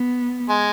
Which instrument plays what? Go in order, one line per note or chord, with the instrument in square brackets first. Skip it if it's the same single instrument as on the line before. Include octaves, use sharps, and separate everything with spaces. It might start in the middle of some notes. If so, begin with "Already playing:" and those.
Already playing: [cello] B3
[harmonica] G#3